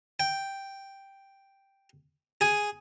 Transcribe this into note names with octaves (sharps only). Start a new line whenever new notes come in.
G5
G#4 G#5